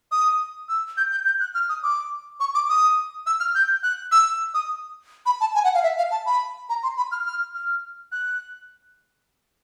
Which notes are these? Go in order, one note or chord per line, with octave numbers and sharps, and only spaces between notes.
D#6
E6
G6
G6
G6
F#6
F6
D#6
D6
C#6
D6
D#6
E6
F6
G6
F#6
E6
D#6
B5
A5
G#5
F#5
F5
E5
F5
A5
B5
A#5
C6
B5
F6
F6
F6
F#6